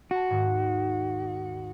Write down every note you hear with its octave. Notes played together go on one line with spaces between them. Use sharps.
F#4 A5 C6 C#7
D#2 G#2